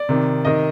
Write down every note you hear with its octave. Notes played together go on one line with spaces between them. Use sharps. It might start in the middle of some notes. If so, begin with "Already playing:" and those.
Already playing: D5
C3 D#3
C3 D#3 D#5